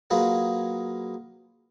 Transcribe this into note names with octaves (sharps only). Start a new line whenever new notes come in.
F#3 A#3 F4 G#4 B4 F#5